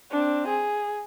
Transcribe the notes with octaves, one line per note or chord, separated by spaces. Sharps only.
C4 D4
G#4